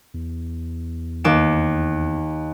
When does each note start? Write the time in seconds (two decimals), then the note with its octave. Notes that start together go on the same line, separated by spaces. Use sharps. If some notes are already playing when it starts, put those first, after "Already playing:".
0.14 E2
1.24 D#2 D6 E7